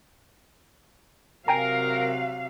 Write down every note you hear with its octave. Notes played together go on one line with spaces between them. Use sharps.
C3 F#3 A#4 F5 G5 G#5 A#5